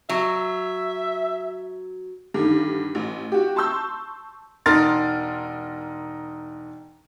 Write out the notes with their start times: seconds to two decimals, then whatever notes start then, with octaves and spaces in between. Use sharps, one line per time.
0.09 F#3 E5
2.34 G2 D3 D#3
2.95 A1
3.32 F#4 G4
3.56 A5 C6 C#6 E6 G6
4.66 E1 D#4 A#4 C6 F6 A6